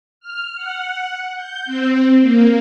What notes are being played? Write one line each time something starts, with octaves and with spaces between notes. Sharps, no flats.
F6
F#5
G6
C4
A#3